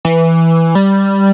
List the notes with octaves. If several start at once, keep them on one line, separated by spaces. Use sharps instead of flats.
E3
G3